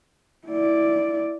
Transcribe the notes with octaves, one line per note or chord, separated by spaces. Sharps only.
E4 D5